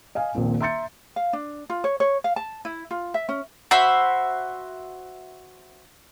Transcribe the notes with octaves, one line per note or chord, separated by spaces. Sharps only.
D#5 F5 G#5
D#1 A#1 A#2 C4
E5 A#5 C6 G6 A6 C#7
F5
D4
F4
C#5
C#5
F5
A5
E4
F4
E5
C#4
F#4 C5 E5 B5